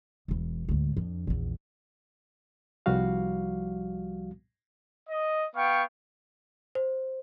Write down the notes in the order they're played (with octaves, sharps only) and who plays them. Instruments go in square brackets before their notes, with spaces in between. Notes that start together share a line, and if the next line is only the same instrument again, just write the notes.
[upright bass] E1 E3
D2 G#2
F2 D4
A#1 E2
[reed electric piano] C2 F3 G3 F#4 F5
[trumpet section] D#5
B3 F5 G5 C#6
[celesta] C5